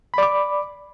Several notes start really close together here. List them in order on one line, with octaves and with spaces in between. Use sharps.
B5 D5 D6